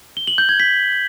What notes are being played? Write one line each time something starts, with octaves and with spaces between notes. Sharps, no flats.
G7
F#7
G6
G#6
B6